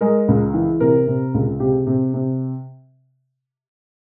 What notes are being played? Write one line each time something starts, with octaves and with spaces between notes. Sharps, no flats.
G#3 A#4
C#2
E3
C3 A#4
C3
C#2
C3 G4
C3
C3